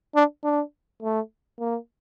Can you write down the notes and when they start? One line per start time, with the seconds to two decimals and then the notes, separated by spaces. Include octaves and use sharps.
0.15 D4
0.44 D4
1.02 A3
1.59 A#3